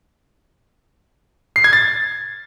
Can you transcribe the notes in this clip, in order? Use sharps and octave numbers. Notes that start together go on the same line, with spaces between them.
C7
G#6
A6